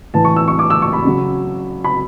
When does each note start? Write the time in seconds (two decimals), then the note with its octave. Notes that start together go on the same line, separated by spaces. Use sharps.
0.14 A2 E3 A5
0.25 C#6
0.36 E6
0.48 C#6
0.59 D6
0.70 E6
0.82 C#6
0.93 B5
1.05 C#3 F#3
1.84 B5